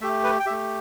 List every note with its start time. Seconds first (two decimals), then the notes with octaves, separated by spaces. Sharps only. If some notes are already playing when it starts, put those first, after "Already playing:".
0.01 A3 G4 E5
0.24 B4
0.40 G5
0.46 G4 E5
0.50 A3